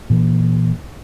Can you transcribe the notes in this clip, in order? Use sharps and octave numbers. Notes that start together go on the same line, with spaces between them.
A#2 E3 A#3